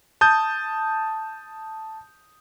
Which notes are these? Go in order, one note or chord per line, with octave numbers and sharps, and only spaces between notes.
A5 D#6 G6